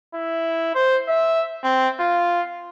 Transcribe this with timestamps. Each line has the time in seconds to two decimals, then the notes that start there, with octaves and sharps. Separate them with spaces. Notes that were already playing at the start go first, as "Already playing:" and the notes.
0.14 E4
0.75 C5
1.09 E5
1.64 C4
2.00 F4